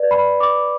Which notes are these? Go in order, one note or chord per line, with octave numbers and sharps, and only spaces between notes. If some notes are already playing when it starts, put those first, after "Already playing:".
Already playing: B4 D5
B5
D6